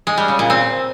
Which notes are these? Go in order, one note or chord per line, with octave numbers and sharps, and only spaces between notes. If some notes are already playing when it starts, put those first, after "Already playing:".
G#3
G3
C#3
A#2
C4